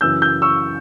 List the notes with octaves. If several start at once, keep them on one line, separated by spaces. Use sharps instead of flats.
F#2 C#3 E3 E6 G6
E6 G6
C#6 E6